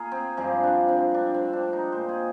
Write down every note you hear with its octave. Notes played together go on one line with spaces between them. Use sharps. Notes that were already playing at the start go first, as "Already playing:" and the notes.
Already playing: A#3 F4 G#4 A#4
C4
G2 F3 G#3 C4
D4
C4
D4
C4
C4
D4
D4
D#4
A#2 G#3 C5
G#4